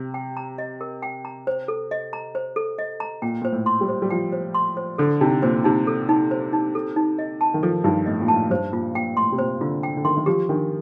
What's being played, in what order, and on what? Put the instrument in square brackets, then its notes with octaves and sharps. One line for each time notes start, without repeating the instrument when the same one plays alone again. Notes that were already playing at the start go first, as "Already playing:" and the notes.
Already playing: [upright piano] C3
[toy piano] G5
A#5
D#5
A#4
G5
A#5
C5
A4
D#5
A#5
C5
A4
D#5
A#5
[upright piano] A#2 [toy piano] G5
[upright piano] A#2 [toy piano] C5
[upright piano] A2
[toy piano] C6
[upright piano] G3
[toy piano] C5
[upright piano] G3
[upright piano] F3 [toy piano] G5
[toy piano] C5
C6
C5
[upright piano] D3 [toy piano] A4
[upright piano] C3 [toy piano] D#4
[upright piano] A#2 [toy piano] C5
[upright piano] C3 [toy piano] D#4
[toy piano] A4
D#4
C5
D#4
A4
D#4
D#5
A5
[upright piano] D#3
[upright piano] F3 [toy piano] A4
[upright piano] G2 [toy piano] D#4
[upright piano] A2 [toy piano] D#5
[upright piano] A#2
[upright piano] A2 [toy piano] A5
[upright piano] G2 [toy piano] C5
[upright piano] A#2 [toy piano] F4
[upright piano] A#2 [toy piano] G5
[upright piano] A2 [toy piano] C6
[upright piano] C3
[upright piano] A#2 [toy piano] C5
[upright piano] D3 [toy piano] F4
[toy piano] G5
[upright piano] D3
[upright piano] D#3 [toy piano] C6
[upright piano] D#3
[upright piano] F3 [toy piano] G4
[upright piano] D#3 [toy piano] D4